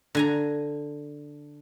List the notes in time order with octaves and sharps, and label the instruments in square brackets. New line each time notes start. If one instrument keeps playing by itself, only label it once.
[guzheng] D3 G#5 A#5